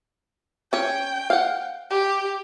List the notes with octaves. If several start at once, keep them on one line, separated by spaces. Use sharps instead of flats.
C#4 C#5 G5
F5 F#5
G4